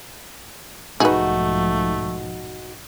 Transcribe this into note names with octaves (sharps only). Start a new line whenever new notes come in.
B1 G#2 F3 A3 D#4 F#4 G#4 B4